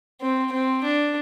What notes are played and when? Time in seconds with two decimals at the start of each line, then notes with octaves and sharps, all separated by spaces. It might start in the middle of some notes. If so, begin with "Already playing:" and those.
0.21 C4
0.52 C4
0.84 D4